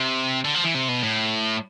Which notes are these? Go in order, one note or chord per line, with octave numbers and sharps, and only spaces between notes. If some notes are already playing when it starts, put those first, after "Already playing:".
Already playing: C3
D3
F3
E3
C3
B2
A2